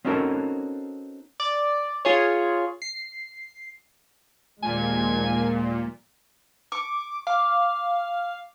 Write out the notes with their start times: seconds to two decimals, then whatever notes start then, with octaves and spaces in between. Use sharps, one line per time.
0.05 C4 C#4 D#4 F#4 A4 A#4
1.40 D5
2.05 F4 G#4 C#5
2.82 C7
4.63 D#2 A#2 F3 G#3 G#5
6.72 C#6 D6
7.27 F5 D6